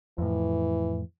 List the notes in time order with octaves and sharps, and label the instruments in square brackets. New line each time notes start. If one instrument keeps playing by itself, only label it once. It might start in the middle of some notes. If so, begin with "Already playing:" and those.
[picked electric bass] F2 A2 [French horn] E3